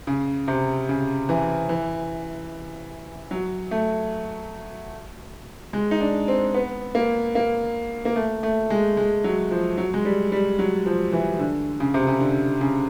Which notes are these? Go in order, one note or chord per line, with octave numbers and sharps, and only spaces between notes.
C#3
C3
C#3
E3
E3
F#3
A3
G#3
D#4
D4
C4
B3
A#3
A#3
A#3
A3
A3
G#3
G#3
F#3
F3
F#3
G#3
G3
G3
F#3
F3
E3
D3
C#3
C3
C#3
D3
C#3